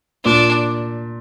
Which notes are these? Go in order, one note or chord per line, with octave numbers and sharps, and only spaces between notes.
A#2 D4